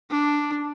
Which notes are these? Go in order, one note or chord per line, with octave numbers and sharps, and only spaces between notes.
D4